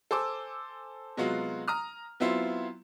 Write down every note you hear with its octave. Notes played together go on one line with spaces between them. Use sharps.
A4 C5 G#5 D6 E6
C3 F#3 G#3 B3 F4 F#4
A#5 D#6 F6
F#3 B3 C4 E4 F4